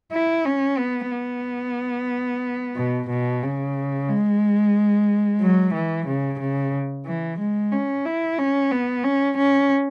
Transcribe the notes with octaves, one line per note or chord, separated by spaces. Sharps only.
E4
C#4
B3
B3
B2
B2
C#3
G#3
F#3
E3
C#3
C#3
E3
G#3
C#4
E4
C#4
B3
C#4
C#4